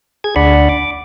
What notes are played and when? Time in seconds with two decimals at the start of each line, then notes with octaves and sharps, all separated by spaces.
0.24 G#4 G#6
0.36 D2 D4 D5 F#5 B5
0.69 D6